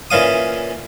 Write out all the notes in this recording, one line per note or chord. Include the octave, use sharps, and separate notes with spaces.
A#2 E3 C#4 F5 D#6